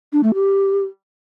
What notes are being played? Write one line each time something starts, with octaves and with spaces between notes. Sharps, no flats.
D4
A3
G4